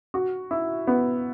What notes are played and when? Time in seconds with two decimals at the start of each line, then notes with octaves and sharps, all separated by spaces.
0.14 F#4
0.51 E4
0.87 B3